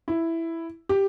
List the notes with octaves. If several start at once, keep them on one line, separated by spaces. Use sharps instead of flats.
E4
G4